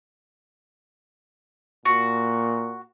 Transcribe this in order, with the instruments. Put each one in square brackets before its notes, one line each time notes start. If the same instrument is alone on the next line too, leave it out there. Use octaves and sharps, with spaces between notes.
[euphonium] A#2 [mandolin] F#4